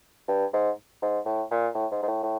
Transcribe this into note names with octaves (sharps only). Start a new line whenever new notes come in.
G2
G#2
G#2
A2
A#2
A2
G#2
G#2
A2
A2